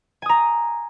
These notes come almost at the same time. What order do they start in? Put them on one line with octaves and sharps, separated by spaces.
G#5 D#6 A#5